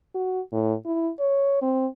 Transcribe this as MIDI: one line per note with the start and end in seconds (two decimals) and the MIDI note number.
0.15 0.40 66
0.52 0.74 45
0.85 1.11 64
1.19 1.57 73
1.62 1.87 60